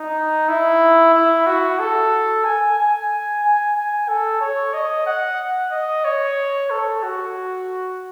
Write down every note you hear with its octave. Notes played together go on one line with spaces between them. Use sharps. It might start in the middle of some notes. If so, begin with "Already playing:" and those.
Already playing: D#4
E4
E4
F#4
A4
G#5
G#5
G#5
G#5
A4
C#5
D#5
F#5
D#5
C#5
A4
F#4